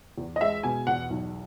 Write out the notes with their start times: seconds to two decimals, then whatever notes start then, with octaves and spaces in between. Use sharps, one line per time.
0.18 E2
0.36 D#5
0.41 G#3 E5
0.63 B2 G#5
0.87 E2 F#5
1.10 B1